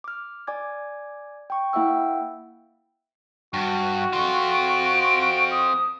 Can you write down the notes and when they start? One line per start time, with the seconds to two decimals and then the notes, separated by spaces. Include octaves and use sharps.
0.04 D6 F6
0.47 D5 G#5 D6 G#6
1.50 G5 C#6
1.73 A#3 E4 E5 F#5 G5 E6
3.54 G2 F#4
4.13 C4 F4
4.54 D7
5.51 D#6